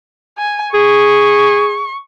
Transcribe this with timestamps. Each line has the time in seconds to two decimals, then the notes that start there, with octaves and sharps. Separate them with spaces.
0.38 G#5
0.74 G#4 C#6